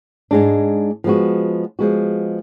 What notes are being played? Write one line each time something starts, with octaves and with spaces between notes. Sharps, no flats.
G#2 G#3 D4
F3 G#3 B3 F#4
F3 G#3 B3 F#4